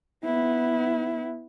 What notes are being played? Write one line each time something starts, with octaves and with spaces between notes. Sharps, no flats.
B3 E4